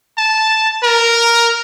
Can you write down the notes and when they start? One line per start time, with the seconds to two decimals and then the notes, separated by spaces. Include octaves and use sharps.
0.18 A5
0.83 A#4